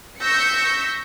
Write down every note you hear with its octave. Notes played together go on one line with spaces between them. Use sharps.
C#6 E6 G6 A#6 B6 C#7